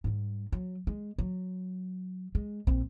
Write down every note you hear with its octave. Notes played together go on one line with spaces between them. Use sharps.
G#2 G3
F#3
G#3
F#3
G#3
A#1 C4